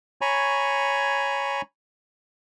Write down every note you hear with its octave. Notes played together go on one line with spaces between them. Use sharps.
C#5 G#5 A#5 B5 C#6